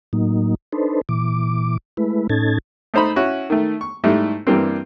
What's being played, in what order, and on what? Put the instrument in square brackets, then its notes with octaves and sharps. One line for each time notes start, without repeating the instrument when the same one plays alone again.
[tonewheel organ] A2 F#3 A#3 D#4
D4 D#4 A4 B4 C5
A#2 E3 D6
G#3 A3 E4 B4
A2 C#4 D#4 A4 G#6 A6
[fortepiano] A3 D#4 C5 A#5 B5
C#4 E4 F#4
D#3 A3
C#6
G#2 G3 A3 E4
G2 E3 G3 A#3 C4